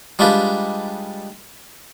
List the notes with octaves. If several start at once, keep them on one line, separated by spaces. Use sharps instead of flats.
G3 G#3 D4 F4 G4 B4